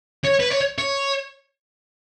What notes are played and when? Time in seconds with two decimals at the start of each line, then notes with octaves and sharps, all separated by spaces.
0.24 C#5
0.40 B4
0.50 C#5
0.78 C#5